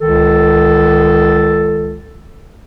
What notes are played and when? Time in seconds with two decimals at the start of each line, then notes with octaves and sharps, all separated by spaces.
0.01 C#2 D#3 A4